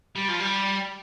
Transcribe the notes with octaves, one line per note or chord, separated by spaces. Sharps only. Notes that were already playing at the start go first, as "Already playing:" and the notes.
G3
F3
G3